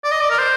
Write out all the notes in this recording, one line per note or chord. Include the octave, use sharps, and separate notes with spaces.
D5
D#5
D5
A#4
C5